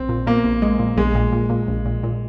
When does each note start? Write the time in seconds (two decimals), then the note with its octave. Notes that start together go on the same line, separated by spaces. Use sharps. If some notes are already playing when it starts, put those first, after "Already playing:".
Already playing: A#1 C4
0.09 A#2
0.27 A#2 A#3
0.44 A#1
0.62 G#3
0.79 A#2
0.97 A#1 G#3
1.15 A#2
1.33 A#2
1.50 A#2
1.68 A#1
1.85 A#2
2.03 A#2